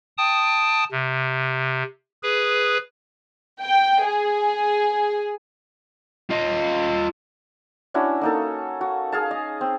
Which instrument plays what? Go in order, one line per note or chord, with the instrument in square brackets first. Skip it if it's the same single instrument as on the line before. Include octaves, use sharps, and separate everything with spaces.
[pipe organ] G5 A5 D#6
C3
G#4 B4
[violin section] G5
G#4
[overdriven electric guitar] F4 D#5
[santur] C#4 D4 E4 F#4
A#3 D#4 A4
F#4
G#4 F5 A5
D#5
C4